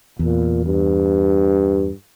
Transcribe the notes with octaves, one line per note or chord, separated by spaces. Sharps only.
E2 A#2
G2